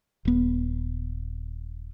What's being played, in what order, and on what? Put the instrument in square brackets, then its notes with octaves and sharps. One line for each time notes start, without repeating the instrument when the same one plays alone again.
[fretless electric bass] D#1 B3